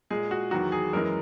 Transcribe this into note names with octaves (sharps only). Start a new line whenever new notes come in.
A#2 G#3 G#4
F#4
E2 D#3 F#3 F#4
G#4
F#2 E3 G#3 A#4